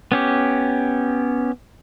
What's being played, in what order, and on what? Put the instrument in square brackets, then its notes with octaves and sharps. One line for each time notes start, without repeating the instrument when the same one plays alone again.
[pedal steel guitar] B3 C#4 G4